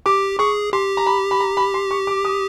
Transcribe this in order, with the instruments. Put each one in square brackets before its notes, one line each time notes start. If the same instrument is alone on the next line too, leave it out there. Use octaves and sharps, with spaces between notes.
[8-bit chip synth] G4 [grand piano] D6
[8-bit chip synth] G#4 [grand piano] C#6
[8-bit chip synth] G4 [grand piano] C6
[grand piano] A#5
B5
B5
A#5
B5
C6
C#6
D6
D#6